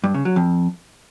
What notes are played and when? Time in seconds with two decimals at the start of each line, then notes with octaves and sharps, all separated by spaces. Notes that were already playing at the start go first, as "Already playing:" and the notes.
0.04 G2
0.14 C#3
0.25 F#3
0.36 F2